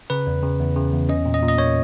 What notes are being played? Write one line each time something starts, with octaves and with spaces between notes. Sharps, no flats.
C#3 B4
E2
C#3
E2
C#3
E2
C#4 D#5
A#2
D#5
A#2
D#5
A#3 C#5